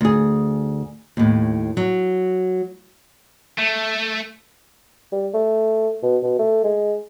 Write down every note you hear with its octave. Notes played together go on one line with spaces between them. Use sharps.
D2 G#4
D#2 A2
F#3
A3
G3
A3
B2
B2
A3
G#3